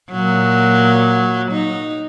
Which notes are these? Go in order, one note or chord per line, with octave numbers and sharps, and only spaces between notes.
A#2 F#3
D#4